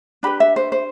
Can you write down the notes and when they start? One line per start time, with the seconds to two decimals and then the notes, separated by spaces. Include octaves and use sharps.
0.23 D4 G4 B4 B5
0.40 E5
0.56 C5
0.72 C5